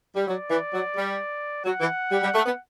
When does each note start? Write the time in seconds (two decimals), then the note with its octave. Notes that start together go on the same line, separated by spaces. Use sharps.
0.16 G3
0.28 F#3 D5
0.50 E3
0.74 F#3
0.96 G3
1.65 F#3 F#5
1.81 E3
2.12 G3
2.23 G3
2.35 A3
2.46 B3